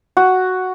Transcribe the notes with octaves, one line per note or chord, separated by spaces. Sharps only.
F#4